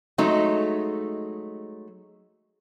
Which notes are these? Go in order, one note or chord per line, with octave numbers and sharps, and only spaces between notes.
F#3 G#3 A3 D#4